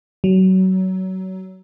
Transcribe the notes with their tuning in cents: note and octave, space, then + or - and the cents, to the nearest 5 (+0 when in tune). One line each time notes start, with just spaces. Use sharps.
F#3 +25